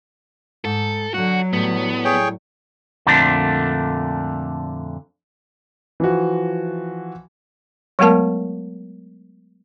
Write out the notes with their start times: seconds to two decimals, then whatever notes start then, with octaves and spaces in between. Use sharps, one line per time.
0.65 G#2 A4
1.14 D3 F#3 F#4 F#5
1.53 A2 G3 B3
2.05 G#4 C#5 G5
3.07 F2 A#2 D3 A3 D4
6.00 E3 F3 F#4
7.99 F#3 G#3 A3 B3 A#4 A5